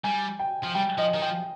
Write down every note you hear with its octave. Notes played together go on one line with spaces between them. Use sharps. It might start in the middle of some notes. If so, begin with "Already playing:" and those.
G3 G#5
G5
F3
G3 G5
F3 D#5
D#3
F3 G5